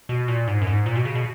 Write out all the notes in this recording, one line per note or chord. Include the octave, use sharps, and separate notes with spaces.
B2
A#2
G#2
F#2
G#2
A#2
B2
C#3
B2